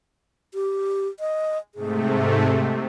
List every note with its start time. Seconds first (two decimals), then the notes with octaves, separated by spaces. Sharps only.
0.54 G4
1.20 D#5
1.75 G#2 C3 A3 G#4